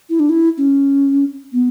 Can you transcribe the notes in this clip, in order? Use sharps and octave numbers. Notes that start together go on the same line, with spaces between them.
E4
D4
E4
C#4
B3